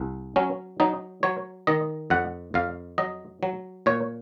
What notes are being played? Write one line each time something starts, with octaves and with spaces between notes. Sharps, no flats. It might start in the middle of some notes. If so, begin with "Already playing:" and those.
Already playing: C2
F#3 C#4
F#3 D#4
F#3 C#5
D#3 D#5
F2 F#5
F2 F5
F#3 D#5
F#3
A#2 C#5